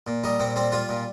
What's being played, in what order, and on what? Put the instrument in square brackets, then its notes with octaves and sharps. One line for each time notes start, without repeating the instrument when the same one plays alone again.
[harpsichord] A#2
G3 D#4
A#2 C4
G3 C4
G3 F4
A#2